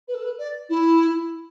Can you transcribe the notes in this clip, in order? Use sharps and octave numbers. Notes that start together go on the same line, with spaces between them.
B4
A4
B4
D5
E4